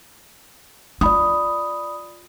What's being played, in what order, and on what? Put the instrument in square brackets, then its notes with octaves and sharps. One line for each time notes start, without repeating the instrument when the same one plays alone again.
[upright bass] D#4 F4 [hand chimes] D5 B5 D#6